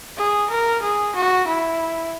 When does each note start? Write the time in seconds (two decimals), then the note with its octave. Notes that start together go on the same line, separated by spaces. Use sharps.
0.17 G#4
0.50 A#4
0.82 G#4
1.16 F#4
1.48 E4